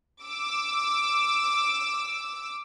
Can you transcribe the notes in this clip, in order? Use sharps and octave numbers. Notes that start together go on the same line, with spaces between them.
D6 E6